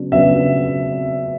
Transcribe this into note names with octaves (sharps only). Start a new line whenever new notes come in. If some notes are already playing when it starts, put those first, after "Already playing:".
Already playing: C#3 F#3 B3 D4
C#3 F#3 B3 D4 E5